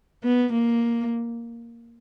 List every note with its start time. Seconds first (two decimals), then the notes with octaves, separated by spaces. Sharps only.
0.24 B3
0.53 A#3